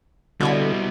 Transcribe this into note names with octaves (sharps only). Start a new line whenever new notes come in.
B2 D3 G3 E4 C#5 B5